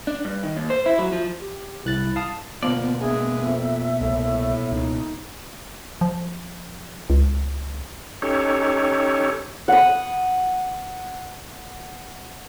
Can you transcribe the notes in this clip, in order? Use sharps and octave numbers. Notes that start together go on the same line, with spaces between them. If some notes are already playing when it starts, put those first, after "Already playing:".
D4
G2
D#3
D#2
C5
E4
F#3
F3
G4
C2 E4 F#6 A6
F5 A5 D#6
B2 D3 F3 A#3 B3 D5
G#3 D4 G#4 E5
F2
C2 A2
C#2 D#4
F3
C#2
C#4 D#4 G4 A4 C#5
F#5 D#6